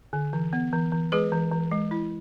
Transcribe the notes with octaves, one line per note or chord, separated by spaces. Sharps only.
D3
E3
B3
E3
E3
G#3 G#4 B4
E3
E3
G#3
E4